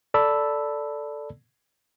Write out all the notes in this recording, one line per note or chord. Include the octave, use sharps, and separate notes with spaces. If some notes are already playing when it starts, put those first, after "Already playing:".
A4 D5 A5 B5 E6